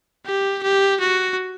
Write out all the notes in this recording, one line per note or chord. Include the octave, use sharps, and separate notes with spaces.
G4
G4
F#4